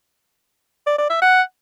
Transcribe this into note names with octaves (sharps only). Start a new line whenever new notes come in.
D5
D5
E5
F#5